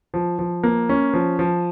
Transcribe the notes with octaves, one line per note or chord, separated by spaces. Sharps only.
F3
F3
A#3
C#4
F3
F3